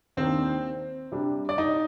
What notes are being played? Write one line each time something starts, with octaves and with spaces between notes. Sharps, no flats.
D#2 D#3 A#3 C4 D4 C5
C3 G3 D4
D5
D#4 D#5